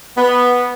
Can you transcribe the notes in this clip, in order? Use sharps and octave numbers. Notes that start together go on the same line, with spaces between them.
B3